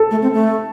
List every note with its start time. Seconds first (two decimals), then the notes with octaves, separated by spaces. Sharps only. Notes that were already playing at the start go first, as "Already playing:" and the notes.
Already playing: A4
0.11 A3
0.22 C4
0.34 A3